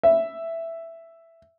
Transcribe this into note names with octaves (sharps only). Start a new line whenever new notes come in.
E5